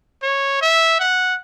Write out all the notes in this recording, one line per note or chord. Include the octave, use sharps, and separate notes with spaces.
C#5
E5
F#5